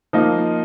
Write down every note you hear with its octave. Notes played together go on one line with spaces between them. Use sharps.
F3 A#3 D#4